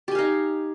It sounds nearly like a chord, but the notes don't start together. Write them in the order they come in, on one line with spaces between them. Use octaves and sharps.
G4 G#5 F5 D#4